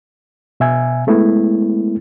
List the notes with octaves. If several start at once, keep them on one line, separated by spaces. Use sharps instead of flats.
B2 E5 G#5
G#3 A3 B3 E4